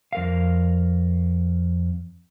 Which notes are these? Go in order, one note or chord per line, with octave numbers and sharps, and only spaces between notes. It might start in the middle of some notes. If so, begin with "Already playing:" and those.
F2 A#4 F5